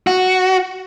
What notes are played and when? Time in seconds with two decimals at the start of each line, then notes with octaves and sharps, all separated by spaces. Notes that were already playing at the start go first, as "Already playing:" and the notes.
0.07 F#4